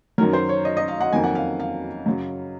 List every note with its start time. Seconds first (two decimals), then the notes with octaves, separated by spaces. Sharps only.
0.18 F#2 D#3 F#3 A#4
0.33 C5
0.49 C#5
0.65 D#5
0.77 D#5
0.88 F5
1.00 F#5
1.12 F2 D#3 F#3 A#3 G#5
1.24 F#5
1.35 F5
1.60 F5
2.06 F#2 C#3 F#3